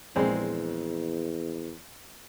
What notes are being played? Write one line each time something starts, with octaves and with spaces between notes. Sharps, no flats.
A#1 E2 G#3 C4